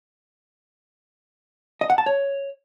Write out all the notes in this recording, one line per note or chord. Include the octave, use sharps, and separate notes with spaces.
D#5
F#5
A5
C#5